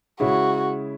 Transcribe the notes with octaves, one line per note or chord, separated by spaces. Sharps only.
C#3 G#3 C#4 E4 F#4 G#4